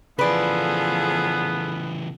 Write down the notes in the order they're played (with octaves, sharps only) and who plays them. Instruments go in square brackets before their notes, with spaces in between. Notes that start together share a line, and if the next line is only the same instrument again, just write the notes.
[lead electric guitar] C#3 E3 [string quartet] F3 G#4 A4 [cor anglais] B3 [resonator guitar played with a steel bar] B4 D5